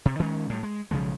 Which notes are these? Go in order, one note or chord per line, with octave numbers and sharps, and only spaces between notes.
C3
D#3 G#3 C#4
A2 G3
G#3
B1 C#3 F3 G#3